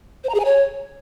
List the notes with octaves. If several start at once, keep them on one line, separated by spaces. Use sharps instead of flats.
C5
A#5
G#4
G#5
C#5